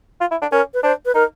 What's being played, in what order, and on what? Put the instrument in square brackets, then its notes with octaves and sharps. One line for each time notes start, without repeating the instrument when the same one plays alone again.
[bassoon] F4
E4
D4
[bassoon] C#4 [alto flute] A#4
[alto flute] B4
[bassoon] D4 [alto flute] C5
[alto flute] B4
[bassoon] D#4 [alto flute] A#4